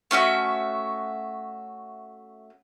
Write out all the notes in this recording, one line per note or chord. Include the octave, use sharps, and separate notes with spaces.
A3 C#4 F#4 E5